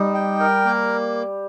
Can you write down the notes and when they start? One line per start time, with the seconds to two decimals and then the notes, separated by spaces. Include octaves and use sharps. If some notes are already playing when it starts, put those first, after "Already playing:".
Already playing: G3 D#4
0.14 G5
0.40 A#4
0.65 A#3